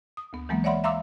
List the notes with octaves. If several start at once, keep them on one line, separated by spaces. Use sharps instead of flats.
D#6
D2 B3
E3 F#3 G#3 A#3 B3
C#5 D5 E5 F#5 B5 C6
E5 F5 A#5 C6 D6 E6